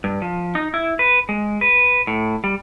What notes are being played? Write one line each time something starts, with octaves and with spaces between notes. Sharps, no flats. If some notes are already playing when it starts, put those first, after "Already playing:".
G2
F3
D#4
E4
B4
G#3
B4
A2
G3